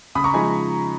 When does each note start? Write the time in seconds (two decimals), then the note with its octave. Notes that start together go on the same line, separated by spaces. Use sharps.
0.15 C#3 B5 D#6
0.24 A#5 C#6
0.34 F3 G#3 D#4 G#5 B5